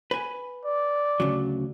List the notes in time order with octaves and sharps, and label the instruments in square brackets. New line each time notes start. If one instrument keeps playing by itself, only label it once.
[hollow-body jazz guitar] B4 G#5
[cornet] D5
[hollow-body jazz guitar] D2 C#3 F#3